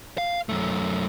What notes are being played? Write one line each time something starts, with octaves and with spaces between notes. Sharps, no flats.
F5
F#2 A3